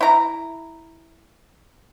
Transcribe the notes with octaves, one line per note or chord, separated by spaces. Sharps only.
E4 A#5